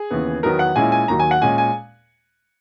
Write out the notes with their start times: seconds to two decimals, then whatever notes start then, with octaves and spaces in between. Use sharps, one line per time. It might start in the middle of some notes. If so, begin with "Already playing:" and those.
Already playing: G#4
0.10 D#2 C#3 E3 B3
0.43 E2 D#3 F#3 B3 A#4
0.59 F#5
0.76 A#2 G#3 C#4 E4 G#5
0.92 G#5
1.08 D#2 D#3 F#3 A#5
1.20 G#5
1.31 F#5
1.41 A#2 G#3 C#4 G#5
1.58 G#5